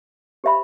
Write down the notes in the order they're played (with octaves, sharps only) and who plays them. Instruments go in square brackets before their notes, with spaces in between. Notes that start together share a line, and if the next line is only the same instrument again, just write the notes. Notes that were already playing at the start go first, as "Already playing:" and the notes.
[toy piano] G4 C5 E5 B5